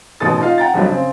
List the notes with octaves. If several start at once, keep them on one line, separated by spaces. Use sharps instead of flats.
A1 B2 D#3 A4 D#6 A6
D#4 F4 F5
F#5 G5 A#5 A6
B1 F2 D3 F#3 G3
C#3 C4